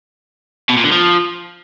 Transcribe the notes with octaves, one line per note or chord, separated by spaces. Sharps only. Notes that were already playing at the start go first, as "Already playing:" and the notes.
B2
A#2
D3
F3